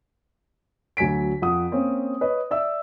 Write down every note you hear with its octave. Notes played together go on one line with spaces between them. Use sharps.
D2 F#3 G#5 B6 D7
F2 F#5 D#6
A#3 C4 C#4
B4 C#5 D#5
D5 E5 E6